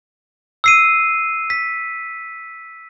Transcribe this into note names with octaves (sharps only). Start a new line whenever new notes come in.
E6 C7 D#7
B6